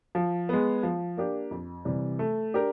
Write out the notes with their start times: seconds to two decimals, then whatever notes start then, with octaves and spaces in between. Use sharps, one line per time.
0.15 F3
0.49 G#3 B3
0.83 F3
1.17 A#3 D4 G4
1.51 F2
1.85 C3 E3 G3
2.19 A3
2.54 D4 G4 A#4